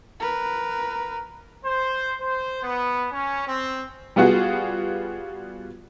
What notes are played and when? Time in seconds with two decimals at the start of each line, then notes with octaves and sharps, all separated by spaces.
0.20 A#4 B4
1.65 C5
2.21 C5
2.63 B3
3.12 C#4
3.47 C4
4.16 G3 B3 F4 F#4 G#4 F#5